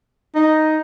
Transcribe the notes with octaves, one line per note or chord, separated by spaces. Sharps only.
D#4